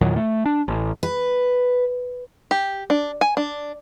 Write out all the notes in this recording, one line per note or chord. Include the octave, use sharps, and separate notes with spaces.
E2 A#2 D#3 F#3
A3
D4
A1
B4
G4
D4
G#5
D4